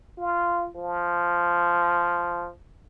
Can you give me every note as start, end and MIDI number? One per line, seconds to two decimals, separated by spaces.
0.18 0.67 65
0.75 2.49 53